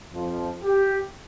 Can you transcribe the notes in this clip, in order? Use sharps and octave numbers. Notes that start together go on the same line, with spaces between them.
F2 F3
G4